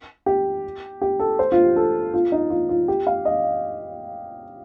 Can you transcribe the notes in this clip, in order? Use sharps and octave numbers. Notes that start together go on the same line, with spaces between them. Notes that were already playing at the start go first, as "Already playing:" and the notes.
G4
G4
A4
C5
F4
G4
A4
F4
D#4
F4
F4
G4
F5
D#5